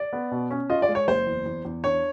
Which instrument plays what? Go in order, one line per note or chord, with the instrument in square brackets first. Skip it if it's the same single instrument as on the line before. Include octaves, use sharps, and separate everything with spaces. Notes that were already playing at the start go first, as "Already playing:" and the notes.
Already playing: [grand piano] D5
[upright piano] B3
B2
C#4
[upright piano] F4 [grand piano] D#5
[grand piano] D5
[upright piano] G#3
[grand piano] C#5
[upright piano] F#1 [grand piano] C5
[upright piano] E2
E2
E2
[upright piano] D4 [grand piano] C#5